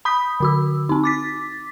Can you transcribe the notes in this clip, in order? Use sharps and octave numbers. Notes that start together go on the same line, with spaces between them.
B5 D#6 G6 B6
D3 F#4 E6
C4 D#4
D6 A6 B6